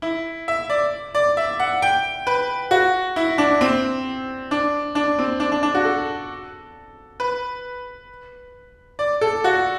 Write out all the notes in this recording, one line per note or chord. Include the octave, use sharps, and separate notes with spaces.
E4
E5
D5
D5
E5
F#5
G5
B4
F#4
E4
D4
C4
D4
D4
C4
D4
D4
D4
F#4
A4
B4
D5
A4
F#4